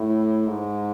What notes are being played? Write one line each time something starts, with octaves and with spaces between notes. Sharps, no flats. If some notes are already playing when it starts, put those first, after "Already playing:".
Already playing: A2
G#2